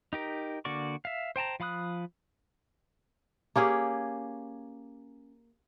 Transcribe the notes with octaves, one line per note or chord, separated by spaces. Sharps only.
D#4 G4 A#4
D3 A#3 F#4 D5 C#6
E5 F5
C5 G5 A5 A#5
F3 F5 B5 D#6 F#6
A#3 C#4 G4 G#4